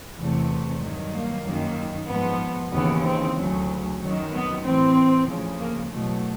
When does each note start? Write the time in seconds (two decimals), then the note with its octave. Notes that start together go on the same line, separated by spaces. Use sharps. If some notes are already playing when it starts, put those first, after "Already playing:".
0.18 E2 C3 E3 A3
0.81 G2 D#3 F#3
1.12 A#3
1.45 F#2 D#3 F#3
2.08 G#2 F3 B3
2.71 D#2 C#3 E3 B3
3.03 C4
3.35 D2 C#3 F#3
3.99 F#2 D#3 F#3
4.31 B3
4.62 A2 E3 C4
5.26 D2 C#3 F3
5.58 A#3
5.90 E2 B2 F#3 A3